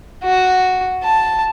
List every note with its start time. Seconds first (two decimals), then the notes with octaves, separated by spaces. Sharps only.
0.23 F#4
1.04 A5